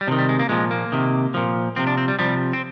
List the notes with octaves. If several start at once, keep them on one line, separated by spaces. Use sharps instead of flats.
G3
C3 D#3 F3
G3
G#3
A#3
A#2 F3 G#3
A#3
C3 D#3
A#2 F3
C3 F3 C4
D4
C4
G3
C3 F3 G3
C4